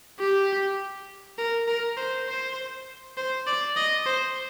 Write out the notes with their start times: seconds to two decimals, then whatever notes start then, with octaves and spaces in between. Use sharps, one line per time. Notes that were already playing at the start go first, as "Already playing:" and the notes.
0.20 G4
1.38 A#4
1.68 A#4
1.97 C5
2.28 C5
3.17 C5
3.47 D5
3.76 D#5
4.06 C5